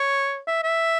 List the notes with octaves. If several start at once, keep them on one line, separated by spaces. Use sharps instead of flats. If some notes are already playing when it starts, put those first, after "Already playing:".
Already playing: C#5
E5
E5